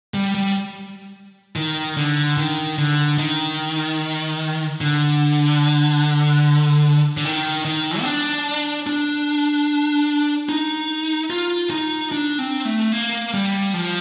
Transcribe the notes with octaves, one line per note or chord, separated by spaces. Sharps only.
G3
G3
D#3
D3
D#3
D3
D#3
D3
D3
D#3
D#3
C4
D4
D4
D#4
F4
D#4
D4
C4
A3
A#3
G3
F3